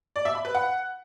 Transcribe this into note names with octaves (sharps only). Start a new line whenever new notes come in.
D5
E5
B5
B4
F#5